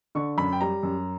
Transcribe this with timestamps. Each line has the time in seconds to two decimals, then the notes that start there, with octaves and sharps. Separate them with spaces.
0.15 D3 C#6
0.38 F#2 B5
0.53 G5
0.61 G3 A#5
0.83 F#2